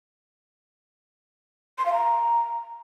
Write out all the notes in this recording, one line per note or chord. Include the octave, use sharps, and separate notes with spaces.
C6
F5
A#5